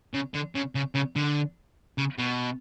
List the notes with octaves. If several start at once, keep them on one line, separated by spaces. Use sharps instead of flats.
C#3
D3
C#3
C#3
C#3
D3
C#3
B2